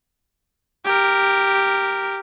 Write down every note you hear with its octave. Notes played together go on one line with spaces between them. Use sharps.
G4 A#4